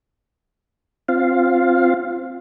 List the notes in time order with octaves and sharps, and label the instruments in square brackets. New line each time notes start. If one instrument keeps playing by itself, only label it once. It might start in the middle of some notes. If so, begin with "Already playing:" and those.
[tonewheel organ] C4 F4 F5